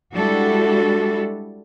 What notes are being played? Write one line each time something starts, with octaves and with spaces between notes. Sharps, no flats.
G3 G#3 D4 E4 F#4 A4